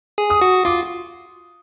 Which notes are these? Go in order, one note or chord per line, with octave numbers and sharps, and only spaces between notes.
G#4
D#6
F#4
F4 D6